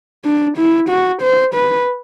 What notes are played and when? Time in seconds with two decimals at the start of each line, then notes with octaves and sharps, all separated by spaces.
0.25 D4
0.58 E4
0.89 F#4
1.22 C5
1.54 B4